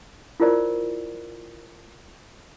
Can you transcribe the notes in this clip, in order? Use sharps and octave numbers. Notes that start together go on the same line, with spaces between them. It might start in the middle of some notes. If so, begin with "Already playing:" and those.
E4 F4 A#4 C5 D5